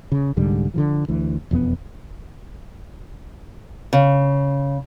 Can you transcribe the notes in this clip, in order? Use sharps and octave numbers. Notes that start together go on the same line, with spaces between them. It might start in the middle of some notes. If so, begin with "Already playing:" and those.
C#3
C2 G#2 D3 G3
D3 E3 F3
D2 E3
E1 F2 F#3 B3
C#3